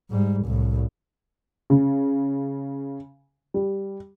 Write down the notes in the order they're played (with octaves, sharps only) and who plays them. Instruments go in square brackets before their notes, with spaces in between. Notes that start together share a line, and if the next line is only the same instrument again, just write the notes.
[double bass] G#2 G3
C2 A2
[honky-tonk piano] C#3
G3